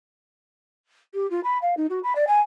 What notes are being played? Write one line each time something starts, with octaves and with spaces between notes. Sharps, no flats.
G4
F4
B5
F5
D#4
F#4
B5
D5
G#5